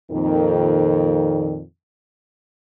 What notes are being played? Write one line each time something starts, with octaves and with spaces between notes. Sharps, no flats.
F2 A#2 D#3